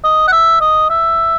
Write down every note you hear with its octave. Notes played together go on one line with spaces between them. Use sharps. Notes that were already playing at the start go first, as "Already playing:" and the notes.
D#5
F#5
E5
D#5
E5